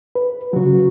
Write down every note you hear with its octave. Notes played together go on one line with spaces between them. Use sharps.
B4
C#3 F#3 F#4